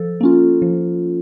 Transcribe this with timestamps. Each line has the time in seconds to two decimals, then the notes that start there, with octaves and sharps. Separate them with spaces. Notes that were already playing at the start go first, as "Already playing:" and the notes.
Already playing: F3 A4
0.21 A#3 C#4 F4
0.62 F3